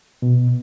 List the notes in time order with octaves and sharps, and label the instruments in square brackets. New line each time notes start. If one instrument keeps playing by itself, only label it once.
[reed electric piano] B2